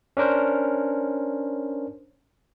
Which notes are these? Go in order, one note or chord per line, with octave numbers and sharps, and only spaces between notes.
C#4 D4 A#4 C5